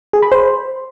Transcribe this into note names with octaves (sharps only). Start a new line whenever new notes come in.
G#4
B5
C5